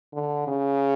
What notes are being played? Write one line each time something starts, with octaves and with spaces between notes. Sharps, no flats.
D3
C#3